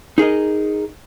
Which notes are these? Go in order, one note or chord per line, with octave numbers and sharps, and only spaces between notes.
D#4 G#4 A#4 D#5